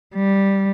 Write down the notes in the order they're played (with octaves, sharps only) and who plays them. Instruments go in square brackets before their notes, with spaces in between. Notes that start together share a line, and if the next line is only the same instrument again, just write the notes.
[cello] G3